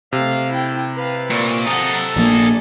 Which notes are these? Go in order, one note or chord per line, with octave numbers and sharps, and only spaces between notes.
C3 A3 F5
E4 G5
B4 F5
A#2 C#6
A4 D#5 F#5 A#5
A#1 A#3 D4 G#5